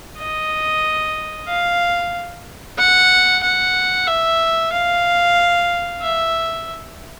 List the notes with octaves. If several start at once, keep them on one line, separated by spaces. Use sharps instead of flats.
D#5
F5
F#5
F#5
E5
F5
E5